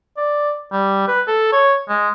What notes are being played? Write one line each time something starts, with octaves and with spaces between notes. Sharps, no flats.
D5
G3
B4
A4
C#5
G#3